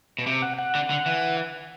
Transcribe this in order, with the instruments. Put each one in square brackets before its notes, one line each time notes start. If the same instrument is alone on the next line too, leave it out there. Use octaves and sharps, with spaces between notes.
[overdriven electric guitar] B2
C3
[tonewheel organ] F#5
F#5
[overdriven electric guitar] D3
D3
E3